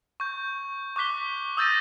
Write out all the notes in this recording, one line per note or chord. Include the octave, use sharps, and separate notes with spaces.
C#6 G6
C#6 D6 F#6 B6 G7
D#6 E6 G6 A6 A#6 D#7